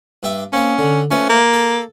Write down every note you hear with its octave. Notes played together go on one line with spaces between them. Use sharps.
G2 G4 E5
A#3 C4 C#4 C5
D3
F3 A3 C#4 B4
A#3
A4